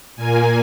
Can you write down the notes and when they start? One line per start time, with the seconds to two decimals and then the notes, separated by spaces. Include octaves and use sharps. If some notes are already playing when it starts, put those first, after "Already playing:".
0.16 A#2 A#3 G#5